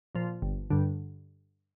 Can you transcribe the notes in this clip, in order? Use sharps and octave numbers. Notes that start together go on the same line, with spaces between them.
A#2 F3
G1
G2 D3